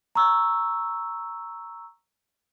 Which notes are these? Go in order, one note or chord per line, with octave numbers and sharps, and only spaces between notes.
A#5 C#6 E6